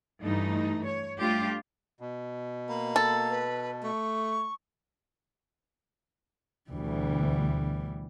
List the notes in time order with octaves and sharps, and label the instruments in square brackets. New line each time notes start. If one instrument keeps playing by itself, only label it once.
[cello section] G2 E3 A3 D#4
C#5
G3 A3 D4 F4 G4
[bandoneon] B2
[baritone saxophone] A#3 [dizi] B5
[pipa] A4
[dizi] B4
[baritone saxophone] A3 [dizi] C#6
[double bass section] D2 [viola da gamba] B2 E3 G3